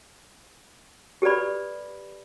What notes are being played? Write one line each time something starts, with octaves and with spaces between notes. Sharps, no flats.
G4 A4 B4 D5 B5